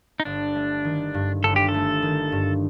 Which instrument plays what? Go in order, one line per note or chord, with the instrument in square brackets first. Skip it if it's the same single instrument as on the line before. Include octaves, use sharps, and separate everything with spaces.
[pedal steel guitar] D#4
[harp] G1 [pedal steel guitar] D4
[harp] A3
D#3
G2
[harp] G1 [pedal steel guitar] A4
[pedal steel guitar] G4
A4
[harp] A3
D#3
G2